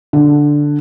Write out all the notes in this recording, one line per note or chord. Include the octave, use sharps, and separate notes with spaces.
D3